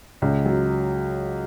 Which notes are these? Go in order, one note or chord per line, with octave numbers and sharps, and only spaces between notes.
C#2
F#3